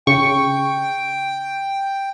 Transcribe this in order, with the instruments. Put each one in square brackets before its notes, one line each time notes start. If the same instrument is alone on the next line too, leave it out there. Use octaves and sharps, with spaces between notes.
[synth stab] C#3 C#6 [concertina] G5